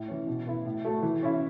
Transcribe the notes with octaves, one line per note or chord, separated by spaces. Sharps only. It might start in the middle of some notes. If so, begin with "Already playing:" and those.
Already playing: A2
E3 C#4
B2
B3 E4
A2
A3 F#4 A4
E3
C#4 E4